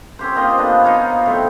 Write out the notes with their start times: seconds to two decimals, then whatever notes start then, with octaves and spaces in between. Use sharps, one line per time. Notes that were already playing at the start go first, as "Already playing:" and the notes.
0.19 C4 C#4 G4 C5
0.36 A#3 C4 F4 D#5
0.58 B3 D4 D#5
0.84 D#4 F4 C#5
1.26 A2 F#3 C4